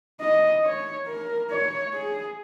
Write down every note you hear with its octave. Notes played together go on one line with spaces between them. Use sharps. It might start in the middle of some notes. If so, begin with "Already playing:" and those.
D#5
C#5
A#4
C#5
G#4